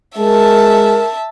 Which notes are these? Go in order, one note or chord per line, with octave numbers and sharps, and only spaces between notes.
G#3 A#4 E5 A5